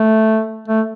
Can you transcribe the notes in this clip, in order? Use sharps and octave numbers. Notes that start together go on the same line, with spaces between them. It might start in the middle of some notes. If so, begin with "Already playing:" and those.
Already playing: A3
A3